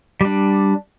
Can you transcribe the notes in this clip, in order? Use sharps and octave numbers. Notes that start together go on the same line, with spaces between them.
G3 D4